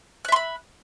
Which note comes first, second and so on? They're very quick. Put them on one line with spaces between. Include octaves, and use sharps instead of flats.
F#6 E5 C6 B5